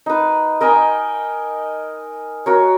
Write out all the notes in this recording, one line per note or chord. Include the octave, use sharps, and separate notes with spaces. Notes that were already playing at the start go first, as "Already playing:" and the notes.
D#4 B4
A#4 D#5 G5 G#5
F#4 A#4 C#5